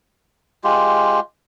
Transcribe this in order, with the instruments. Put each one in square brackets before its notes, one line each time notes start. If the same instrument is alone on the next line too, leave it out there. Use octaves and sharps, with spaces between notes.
[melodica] G#3 F4 G4